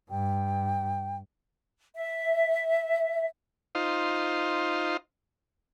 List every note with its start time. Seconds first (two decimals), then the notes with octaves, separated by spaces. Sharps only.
0.10 G2 G5
1.94 E5
3.75 D#4 F4 C5